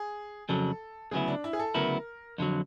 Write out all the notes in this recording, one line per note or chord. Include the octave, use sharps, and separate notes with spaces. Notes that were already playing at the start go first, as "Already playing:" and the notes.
Already playing: G#4
F2 C#3 F#3 A4
D2 C#3 F#3 B3 E4 G#4
D4
E4
G#4
A4
D2 C#3 F#3 B3 E4 A#4
F2 D3 F#3